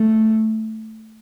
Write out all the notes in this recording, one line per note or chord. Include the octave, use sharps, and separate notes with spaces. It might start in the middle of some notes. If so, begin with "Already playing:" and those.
Already playing: A3